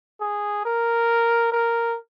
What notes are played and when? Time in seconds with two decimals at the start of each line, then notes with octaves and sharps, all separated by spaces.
0.21 G#4
0.65 A#4
1.52 A#4